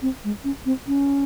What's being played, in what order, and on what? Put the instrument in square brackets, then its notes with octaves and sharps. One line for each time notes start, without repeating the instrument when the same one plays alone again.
[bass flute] C4
G#3
C#4
C4
C#4